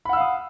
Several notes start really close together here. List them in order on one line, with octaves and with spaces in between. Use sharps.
B5 F#5 E6 F5 D#6